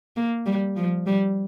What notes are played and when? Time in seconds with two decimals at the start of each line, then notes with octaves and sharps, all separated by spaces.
0.16 A#3
0.46 G3
0.76 F3
1.06 G3